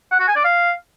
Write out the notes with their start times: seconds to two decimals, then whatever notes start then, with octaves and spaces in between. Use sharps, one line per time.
0.11 F#5
0.20 F#4
0.28 G#5
0.36 D5
0.44 F5